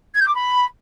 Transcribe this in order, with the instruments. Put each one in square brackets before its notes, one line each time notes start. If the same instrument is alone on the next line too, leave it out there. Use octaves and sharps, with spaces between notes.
[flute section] G#6
G6
D6
B5